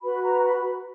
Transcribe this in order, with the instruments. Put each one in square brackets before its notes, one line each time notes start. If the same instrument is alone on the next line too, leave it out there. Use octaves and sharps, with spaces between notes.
[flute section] F#4 B4 B5
A#5
B5